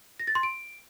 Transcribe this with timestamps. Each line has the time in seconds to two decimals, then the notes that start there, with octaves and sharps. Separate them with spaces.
0.20 A#6
0.27 A6
0.35 C6
0.43 D7